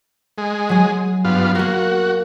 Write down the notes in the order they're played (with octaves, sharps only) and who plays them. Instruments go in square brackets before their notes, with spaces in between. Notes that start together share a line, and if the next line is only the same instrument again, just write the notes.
[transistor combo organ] G#3
[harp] F#3 G#4
[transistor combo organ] G2 B3 F4
[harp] A#3 A#4 [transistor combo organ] F#4